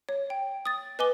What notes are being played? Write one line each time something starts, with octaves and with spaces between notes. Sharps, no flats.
C#5
G5
D#6 A6
B4 D#5 G#5 D6 G7